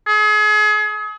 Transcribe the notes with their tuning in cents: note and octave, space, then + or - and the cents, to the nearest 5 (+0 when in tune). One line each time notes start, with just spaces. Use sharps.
G#4 +35